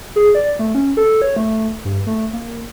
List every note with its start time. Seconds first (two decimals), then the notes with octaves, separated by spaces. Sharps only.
0.16 G#4
0.35 D5
0.59 A3
0.75 C#4
0.97 A4
1.22 C#5
1.36 A3
1.85 G2
2.07 A3
2.33 A#3